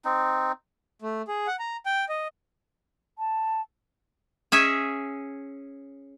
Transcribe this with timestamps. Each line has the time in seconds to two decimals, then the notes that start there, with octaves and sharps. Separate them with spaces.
0.05 C4 D#4
1.02 A3
1.28 G#4
1.47 F#5
1.59 A#5
1.86 G5
2.09 D#5
3.18 A5
4.52 C#4 G#4 E5